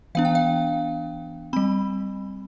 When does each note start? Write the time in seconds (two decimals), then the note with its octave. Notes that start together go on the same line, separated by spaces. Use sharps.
0.15 E3 B3 D4 F5
0.25 G5
0.35 F5
1.53 G3 C4 B5